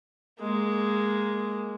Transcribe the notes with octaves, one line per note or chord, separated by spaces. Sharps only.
G#3 A#3